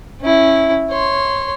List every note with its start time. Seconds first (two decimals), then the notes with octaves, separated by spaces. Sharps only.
0.21 C#4 E4
0.90 C#5 C6